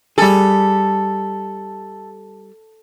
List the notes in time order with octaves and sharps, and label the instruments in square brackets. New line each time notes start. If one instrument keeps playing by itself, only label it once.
[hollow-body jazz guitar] G3 G#4 [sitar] A4